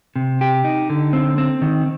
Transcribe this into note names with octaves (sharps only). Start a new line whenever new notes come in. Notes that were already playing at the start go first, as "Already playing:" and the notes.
C3
G4
D#4
D3
C4
C4
D#3